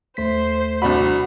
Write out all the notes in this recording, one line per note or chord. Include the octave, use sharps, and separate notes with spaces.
D#2 A3 C5 B6
C2 D4 F#4 B5